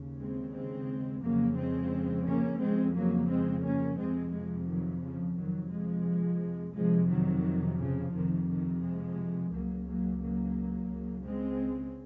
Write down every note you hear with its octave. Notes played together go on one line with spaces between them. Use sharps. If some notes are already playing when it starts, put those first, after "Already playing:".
Already playing: D#2 C#3
G#3 C4
G#3 C4
F2 C#3 F#3 A#3
G#3 C4
A#3 C#4
F2 C#3 G#3 C4
F#3 A#3
G#3 C4
A#3 C#4
F2 C3 G#3 C4
F3 G#3
D#3 F#3
C#3 F3
F2 C3 D#3 F#3
F3 G#3
F2 C3 F3 G#3
D#3 F#3
C#3 F3
F2 C3 D#3
D#3
F3 G#3
C#2 C#3 F#3 A#3
F#3 A#3
F#3 A#3
C#2 C#3
G#3 C4